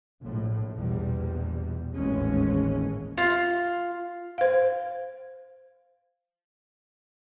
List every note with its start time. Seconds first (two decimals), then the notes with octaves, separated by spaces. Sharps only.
0.21 A#1 A2
0.74 A#1 E2 B2 G3
1.94 G#1 D#2 A2 E3 G#3 C#4
3.18 F4
4.38 C5 F5